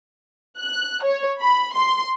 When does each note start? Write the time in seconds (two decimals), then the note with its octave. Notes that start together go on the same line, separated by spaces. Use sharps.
0.58 F#6
1.03 C#5
1.41 B5
1.75 C6